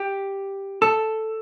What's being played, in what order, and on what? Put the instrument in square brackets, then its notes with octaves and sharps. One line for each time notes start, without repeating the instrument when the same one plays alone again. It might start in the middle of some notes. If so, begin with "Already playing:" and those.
Already playing: [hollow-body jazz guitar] G4
A4